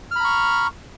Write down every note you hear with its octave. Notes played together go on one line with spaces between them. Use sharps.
A#5 B5 C#6 F6